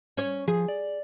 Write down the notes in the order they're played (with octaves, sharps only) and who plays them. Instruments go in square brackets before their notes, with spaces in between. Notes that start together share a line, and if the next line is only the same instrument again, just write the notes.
[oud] C#4 C#5
[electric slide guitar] F3 [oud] G#4
[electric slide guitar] D5